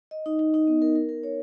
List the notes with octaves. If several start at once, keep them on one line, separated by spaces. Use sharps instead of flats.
D#5
D#4
D#4
D#4
B3
A#4
A#4
A#4
C#5